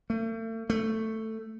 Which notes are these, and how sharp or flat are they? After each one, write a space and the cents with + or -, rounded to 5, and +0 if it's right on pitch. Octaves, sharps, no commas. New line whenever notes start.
A3 +40
A3 +10